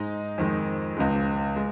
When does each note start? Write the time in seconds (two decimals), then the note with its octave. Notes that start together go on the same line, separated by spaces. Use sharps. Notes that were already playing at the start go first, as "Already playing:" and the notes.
Already playing: G#2 G#3 D#4 D#5
0.38 F2 D#3 G#3
0.97 C#2 C#3 G#3
1.56 G#3